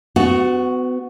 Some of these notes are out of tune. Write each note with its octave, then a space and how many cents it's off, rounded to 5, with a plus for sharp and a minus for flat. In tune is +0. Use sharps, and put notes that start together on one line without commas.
B3 +35 F#4 +0